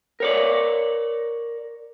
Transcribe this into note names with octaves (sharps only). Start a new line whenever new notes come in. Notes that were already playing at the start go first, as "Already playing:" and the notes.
A#4 C#5 D5